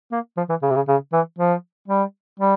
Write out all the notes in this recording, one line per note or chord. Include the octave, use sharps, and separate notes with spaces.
A#3
F3
E3
C#3
C3
C#3
C#3
E3
F3
G3
G3